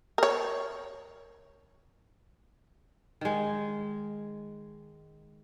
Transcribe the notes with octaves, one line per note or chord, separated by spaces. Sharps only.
A#4 C#5
D#3 G#3